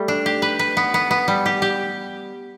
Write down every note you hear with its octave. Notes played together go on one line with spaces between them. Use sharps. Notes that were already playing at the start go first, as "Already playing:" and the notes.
Already playing: G3 A3
D4
G4
B4
B4
B3
B3
B3
G3
G4
G4